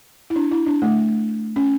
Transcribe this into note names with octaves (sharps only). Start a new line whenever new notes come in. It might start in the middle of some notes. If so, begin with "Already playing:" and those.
E4
D4
E4
D4
A3
C#4